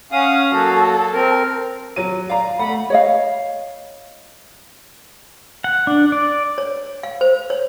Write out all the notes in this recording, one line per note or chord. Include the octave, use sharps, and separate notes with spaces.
C#4 F5 F#5 D#6
F#3 A#3 F#4 A4
C4 A#4
F#3 D#7
D5 F5 A#5
A3 F#5 B5
C#5 D#5 F5
F#5
D4
D5
C#5
F5
C5
C#5